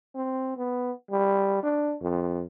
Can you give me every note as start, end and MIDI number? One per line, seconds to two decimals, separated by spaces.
0.15 0.54 60
0.57 0.92 59
1.11 1.63 55
1.63 1.95 62
2.01 2.44 41